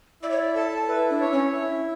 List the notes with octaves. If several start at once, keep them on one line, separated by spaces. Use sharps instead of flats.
E4 D5
C#5
D5
A4 A5
E4 B4
D4
C#5
C#4
E4